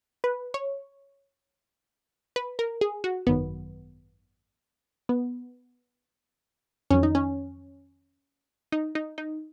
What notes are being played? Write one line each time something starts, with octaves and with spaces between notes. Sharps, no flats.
B4
C#5
B4
A#4
G#4
F#4
G#1 F#2 D#3 F#3 B3
B3
F2 D#3 F#3 C#4
D#4
C#4
D#4
D#4
D#4